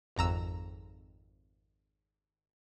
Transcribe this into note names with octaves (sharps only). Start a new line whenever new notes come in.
G#1 F2 A#5 E6